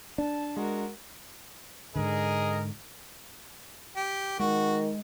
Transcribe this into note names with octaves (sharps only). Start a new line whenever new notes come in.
D4 A5
G#3 F#4 A#4
G#2 D3 G#4 A#4 D#5
G4
D#3 G#3 F#4